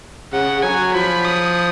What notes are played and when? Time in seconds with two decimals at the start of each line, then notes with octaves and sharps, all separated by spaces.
0.33 C#3 F#5
0.63 F#3 G#5
0.94 F3 B5
1.25 D#6